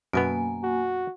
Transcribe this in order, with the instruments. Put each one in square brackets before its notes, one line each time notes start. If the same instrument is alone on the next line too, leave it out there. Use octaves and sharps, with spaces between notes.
[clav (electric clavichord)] F#2 B2 B3 [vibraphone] A#3 G#5
[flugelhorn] F#4